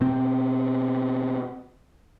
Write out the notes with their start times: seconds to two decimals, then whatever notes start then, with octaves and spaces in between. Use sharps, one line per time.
0.01 B2 C4